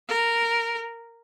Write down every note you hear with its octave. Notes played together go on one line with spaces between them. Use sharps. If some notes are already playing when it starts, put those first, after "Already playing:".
A#4